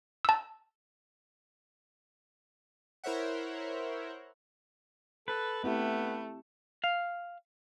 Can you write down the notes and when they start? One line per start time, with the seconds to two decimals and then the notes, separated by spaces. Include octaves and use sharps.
0.25 A5 E6
3.04 E4 A#4 C5 C#5 E5 F#5
5.28 A4 B4
5.64 A3 B3 C4 E4 G4
6.84 F5